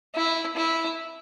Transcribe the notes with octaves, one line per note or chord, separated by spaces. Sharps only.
E4
E4